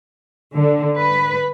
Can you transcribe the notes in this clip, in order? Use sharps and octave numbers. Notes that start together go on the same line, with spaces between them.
D3
B4